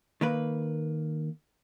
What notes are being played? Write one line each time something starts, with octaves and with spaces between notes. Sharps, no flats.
D#3 A#3 B4